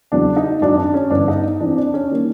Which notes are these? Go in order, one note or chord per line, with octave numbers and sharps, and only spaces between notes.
E2 C#3 F#3 D4
D#4
G#1 F#2 D#3 D4
D4
C#4
G1 G2 E3 D4
D#4
F2 C3 E3 D4
D4
C#4
D#3 G3 A#3